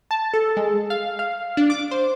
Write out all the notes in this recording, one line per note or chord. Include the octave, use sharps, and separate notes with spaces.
A5
A4
G#3
F5
F5
D4
D6
C5